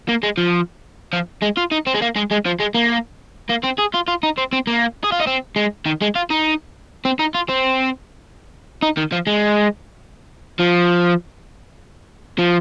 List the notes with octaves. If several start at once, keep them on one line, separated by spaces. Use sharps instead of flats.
A#3
G#3
F3
F3
G#3
F4
D#4
C4
G#3
A#3
G#3
G#3
F3
G#3
A#3
A#3
C4
G#4
F4
F4
D#4
C4
C4
A#3
G#4
F4
D#4
C4
G#3
D#3
G#3
F4
D#4
C4
D#4
F4
C4
D#4
D#3
F3
G#3
F3
F3